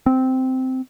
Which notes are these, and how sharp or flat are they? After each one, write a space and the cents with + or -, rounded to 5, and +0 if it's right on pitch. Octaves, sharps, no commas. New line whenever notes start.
C4 -10